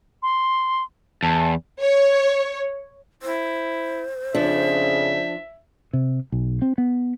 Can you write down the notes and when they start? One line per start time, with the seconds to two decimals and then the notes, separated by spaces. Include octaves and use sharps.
0.22 C6
1.23 E2 A5
1.80 C#5
3.22 E4 C5
4.34 F2 C#3 F3 D4 E5
5.93 C3
6.32 B1
6.62 C4
6.78 B3